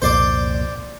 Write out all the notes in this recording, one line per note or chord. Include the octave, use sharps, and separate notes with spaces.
C2 F2 A#2 C5 D5